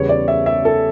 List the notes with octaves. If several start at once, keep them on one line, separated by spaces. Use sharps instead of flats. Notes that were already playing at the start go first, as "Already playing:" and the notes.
Already playing: E2 C#3 G3 B3 C#5
D5
E5
E5
A4